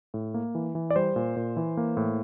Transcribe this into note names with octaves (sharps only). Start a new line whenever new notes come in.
A2
A#3
E3
E3
D5
G3 C5
A#2
A#2
E3
A#3
A2